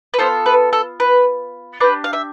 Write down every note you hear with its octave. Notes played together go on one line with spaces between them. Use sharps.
B4
B3 F4 A4 C5
B4
A4
B4
D4 G4 B4
F5
E5